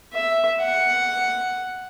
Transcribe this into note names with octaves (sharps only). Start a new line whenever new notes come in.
E5
F#5